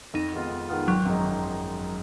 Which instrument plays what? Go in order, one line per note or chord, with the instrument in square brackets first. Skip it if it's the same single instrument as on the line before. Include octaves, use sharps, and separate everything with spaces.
[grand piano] F2 [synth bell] D#4
[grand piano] D#3 G#3 B3 F4
F2
D#3 G#3 B3 F4
[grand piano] G#1 [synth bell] F#3
[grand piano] F#2 F3 G#3 D#4
G#1